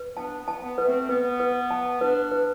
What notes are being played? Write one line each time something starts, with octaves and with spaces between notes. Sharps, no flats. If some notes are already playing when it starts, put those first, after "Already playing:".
Already playing: B4
B3 D4 A5
B3
A5
B3
B4
A3 C4
B3 B4
B4
A5
B3 D4 B4
B4